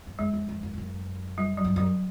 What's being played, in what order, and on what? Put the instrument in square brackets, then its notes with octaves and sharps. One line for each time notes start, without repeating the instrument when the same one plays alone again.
[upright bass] G2
[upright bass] F#2 [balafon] G#3
[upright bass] F2
F2
F#2
F2
F#2
[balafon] G3
F#3
[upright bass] G2
[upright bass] F#2 [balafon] F#3